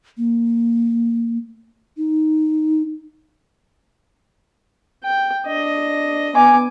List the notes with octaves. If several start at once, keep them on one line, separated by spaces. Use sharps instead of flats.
A#3
D#4
G5
D4 D#5
B3 G#5 D6